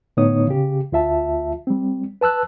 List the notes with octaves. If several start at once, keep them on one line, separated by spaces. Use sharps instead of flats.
A2 D3 B3 D#4 C#5 D#6
C#3 G4
D2 F4 E5 A5
G3 C4
B4 A5 E6 F#6